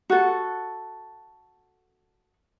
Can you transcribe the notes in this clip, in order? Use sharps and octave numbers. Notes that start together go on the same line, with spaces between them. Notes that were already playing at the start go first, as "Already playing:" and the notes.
F#4 A4